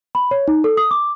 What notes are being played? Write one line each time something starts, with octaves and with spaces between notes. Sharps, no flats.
B5
C#5
D#4
A4
D#6
D6